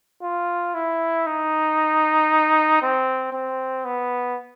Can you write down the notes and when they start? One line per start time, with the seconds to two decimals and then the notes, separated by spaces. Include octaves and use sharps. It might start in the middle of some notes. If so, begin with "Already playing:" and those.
0.22 F4
0.75 E4
1.26 D#4
2.82 C4
3.33 C4
3.85 B3